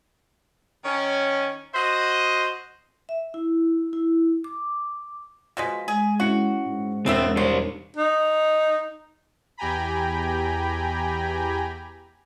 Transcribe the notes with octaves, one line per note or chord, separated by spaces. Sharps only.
D#3 C#4
F#4 C5 D#5
E5
E4
E4
D6
B2 F3 G#3 A#6 B6
G#3 G#4
C#4 E4 F#4 C#7
G#2
E1 A3 B3 C4 D#4 A#4 E5
G3 C5 C#5
D#4
E2 G4 G5 G#5 A#5 B5